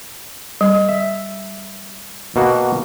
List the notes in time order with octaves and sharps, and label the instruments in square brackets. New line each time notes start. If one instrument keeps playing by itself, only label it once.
[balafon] G3
[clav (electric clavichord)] E5
B2 A#3 F#4